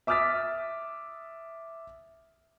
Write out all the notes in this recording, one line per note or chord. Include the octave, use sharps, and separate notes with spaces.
E5 D6 D#6 F6 A6 B6